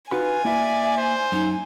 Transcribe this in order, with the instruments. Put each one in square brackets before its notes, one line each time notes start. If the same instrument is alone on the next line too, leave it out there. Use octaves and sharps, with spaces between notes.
[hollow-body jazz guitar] D#4 F#4 B5 [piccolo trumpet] F4 [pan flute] B4 [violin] G#5
[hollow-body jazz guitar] A#3 E4 [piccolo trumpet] D5 [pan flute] E5
[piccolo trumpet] C5
[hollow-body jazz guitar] F#2 [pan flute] D#4